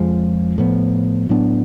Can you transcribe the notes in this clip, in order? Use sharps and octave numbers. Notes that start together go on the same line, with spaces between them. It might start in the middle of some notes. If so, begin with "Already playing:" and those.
Already playing: F2 F3 G#3
A2 F3 B3
A2 F#3 B3 D4